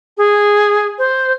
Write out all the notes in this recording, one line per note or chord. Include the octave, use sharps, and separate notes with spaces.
G#4
C5